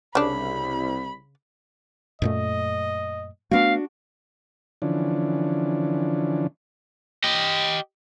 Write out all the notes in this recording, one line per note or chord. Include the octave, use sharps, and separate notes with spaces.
C2 C#3 D4 B5
F#2 A#2 A3 D#5
A3 B3 D4 F#4 F5
D3 E3 F3 C#4 D4
G4 D#5